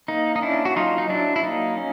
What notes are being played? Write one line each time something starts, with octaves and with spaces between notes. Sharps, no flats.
A#3 D#4
D#4
C#4 D4 E4
F#4
F#3 D#4 F4
D#4
F#3 D4 E4
E4
A#3 D#4
C#4